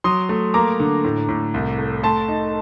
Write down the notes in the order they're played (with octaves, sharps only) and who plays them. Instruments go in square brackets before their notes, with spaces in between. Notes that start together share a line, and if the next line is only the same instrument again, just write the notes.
[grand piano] F#3 [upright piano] C6 D#6
[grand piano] A3
[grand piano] A#3 [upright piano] A#5 D6
[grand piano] D3
A2
A2
C2
A3
[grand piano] A3 [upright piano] A5 C6
[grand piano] D#4